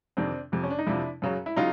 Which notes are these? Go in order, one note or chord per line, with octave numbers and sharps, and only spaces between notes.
F2 C3 D#3 C4 D4
F2 C3 F3
C#4
D4
D#4
F2 C3 F3 D4 E4
F#2 C#3 F#3
E4
C#3 F#3 D#4 F4